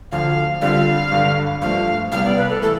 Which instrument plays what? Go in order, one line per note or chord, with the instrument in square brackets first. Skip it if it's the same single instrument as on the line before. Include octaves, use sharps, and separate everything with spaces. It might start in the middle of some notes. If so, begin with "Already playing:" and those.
[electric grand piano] D2 D3 F3 [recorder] F5
[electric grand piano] D3 G3 C4 F4 A4 [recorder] F5
[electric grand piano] G2 D3 G3
[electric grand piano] G2 F3 A3 [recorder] F5
[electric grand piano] C2 C3 G3 B3 [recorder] F5
[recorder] D5
B4
A4
[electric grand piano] E3 A3 [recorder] A4